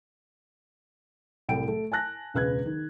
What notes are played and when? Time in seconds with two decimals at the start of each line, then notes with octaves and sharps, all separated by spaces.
1.48 C2 A2 G5 D7
1.68 A3
1.92 G#5 A5 F#6 A#6
2.34 E1 C#2 B4 F#6 G#6
2.66 D#3